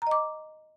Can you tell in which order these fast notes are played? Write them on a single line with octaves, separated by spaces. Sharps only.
A#5 D#5 D6